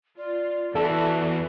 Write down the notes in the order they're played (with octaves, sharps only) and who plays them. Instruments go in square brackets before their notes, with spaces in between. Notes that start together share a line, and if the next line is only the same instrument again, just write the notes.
[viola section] F4 [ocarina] D5
[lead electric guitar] E2 E4 [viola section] E3 F#4 [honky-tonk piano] A4